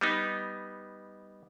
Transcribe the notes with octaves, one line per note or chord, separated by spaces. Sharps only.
G3 B3 D#4